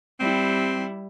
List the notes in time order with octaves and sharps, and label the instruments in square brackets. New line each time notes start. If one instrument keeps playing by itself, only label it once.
[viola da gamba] G3 E4 [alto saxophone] C4